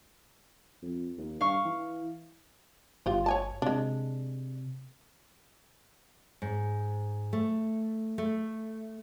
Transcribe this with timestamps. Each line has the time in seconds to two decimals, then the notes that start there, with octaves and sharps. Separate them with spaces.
0.82 F2
1.17 D#2
1.41 G2 F5 C#6
1.65 E3
3.06 G1 F4 G4 C5
3.26 C#5 G#5 A5
3.62 C3 G#3 D4
6.42 G#2
7.33 A3
8.18 A3